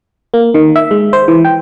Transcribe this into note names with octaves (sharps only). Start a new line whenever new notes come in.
A#3
D#3
E5
G#3
C5
E3
G5